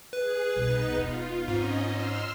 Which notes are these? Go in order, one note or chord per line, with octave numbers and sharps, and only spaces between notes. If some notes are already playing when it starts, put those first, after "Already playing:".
G#4 B4
C2 B2 B3 D#4
E1 D#4 F4
G#2 C4 C#4 D#5
C6 E6 F6